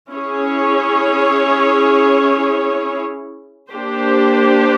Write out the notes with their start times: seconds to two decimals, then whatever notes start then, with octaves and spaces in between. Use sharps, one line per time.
0.10 C#4 E4 G#4 C#5
3.71 A#3 D4 G4 C5